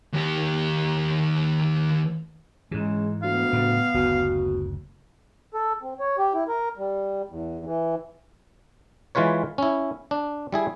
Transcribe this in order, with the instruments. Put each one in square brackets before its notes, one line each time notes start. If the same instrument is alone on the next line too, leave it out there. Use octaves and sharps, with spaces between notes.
[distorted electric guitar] D#2 G4
[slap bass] G#2 E3 [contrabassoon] C#3 [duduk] G#3
[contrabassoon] D2 [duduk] B3 [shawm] F5
[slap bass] A2 C#3 G3
[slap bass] F#1 D2 [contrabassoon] B2
[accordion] A4
C4
C#5
G4
E4
A#4
G3
E2
E3
[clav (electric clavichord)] E3 G#3 F4 B4 C#5
C#4 E4
D4
G3 E4 G#4